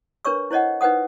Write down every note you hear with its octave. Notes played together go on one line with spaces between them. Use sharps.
D4 A#4 B4 C#5 C#6 E6
E4 C5 C#5 D#5 F#5
D#4 B4 C5 F#5 D#6